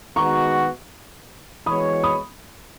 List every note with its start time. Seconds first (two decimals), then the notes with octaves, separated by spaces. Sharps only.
0.16 D#3 G#3 B3 F#4 A#5 C#6
1.66 E3 G#3 B3 F#4 C#5 B5 D#6
2.03 B5 D#6